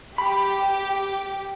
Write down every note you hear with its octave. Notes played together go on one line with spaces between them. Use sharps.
G4 B5